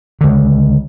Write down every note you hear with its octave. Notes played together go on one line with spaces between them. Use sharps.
C#2 D3